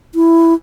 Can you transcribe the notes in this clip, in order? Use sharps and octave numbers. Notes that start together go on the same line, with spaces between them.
E4